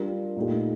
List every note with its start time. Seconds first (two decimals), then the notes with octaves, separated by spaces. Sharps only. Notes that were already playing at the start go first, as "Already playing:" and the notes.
Already playing: G3 D4 F4 A#4
0.36 A#2 A3 D#4 G4